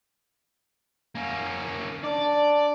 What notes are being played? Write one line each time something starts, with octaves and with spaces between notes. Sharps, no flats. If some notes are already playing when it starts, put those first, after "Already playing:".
A#3 C#4
D4 D5